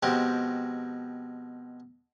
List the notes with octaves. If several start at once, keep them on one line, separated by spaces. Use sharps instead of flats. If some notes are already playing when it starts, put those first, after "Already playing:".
B2 F3 G#3 C4 G4